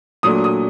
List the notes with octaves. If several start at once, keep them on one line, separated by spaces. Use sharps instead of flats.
A#2 F#3 A3 D4 D#6
D#6